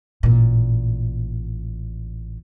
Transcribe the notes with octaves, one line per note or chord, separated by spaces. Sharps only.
A1 A#2